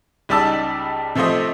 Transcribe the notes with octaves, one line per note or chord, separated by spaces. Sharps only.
C#2 G3 D#4 D5 A5 E6
C3 F3 A3 C5 D#5